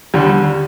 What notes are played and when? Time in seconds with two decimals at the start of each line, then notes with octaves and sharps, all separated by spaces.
0.14 D#2 D3 G3